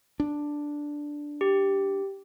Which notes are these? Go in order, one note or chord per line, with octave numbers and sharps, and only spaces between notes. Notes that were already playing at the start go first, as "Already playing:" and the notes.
D4
G4